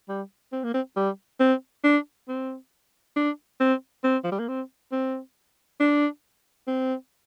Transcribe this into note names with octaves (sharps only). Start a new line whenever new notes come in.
G3
C4
A#3
C4
G3
C4
D4
C4
D4
C4
C4
F3
G3
A#3
C4
C4
D4
C4